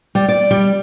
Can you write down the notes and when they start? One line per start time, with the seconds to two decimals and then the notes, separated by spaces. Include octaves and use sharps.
0.15 G3
0.28 D5
0.51 G3